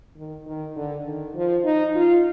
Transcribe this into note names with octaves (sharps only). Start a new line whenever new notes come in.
D#3
D#3
D3
D#3
F3
D#4
F4